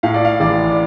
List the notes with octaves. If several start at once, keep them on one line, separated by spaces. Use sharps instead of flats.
A2 F5
D5
F5
A1 D5
D5